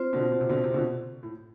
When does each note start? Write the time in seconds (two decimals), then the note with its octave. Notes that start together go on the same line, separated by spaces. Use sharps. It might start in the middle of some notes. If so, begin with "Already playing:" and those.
Already playing: C4 F4 C5
0.13 B2 D3
0.32 B2
0.41 C3
0.50 B2 D3
0.64 C3
0.74 B2 D3
1.23 A2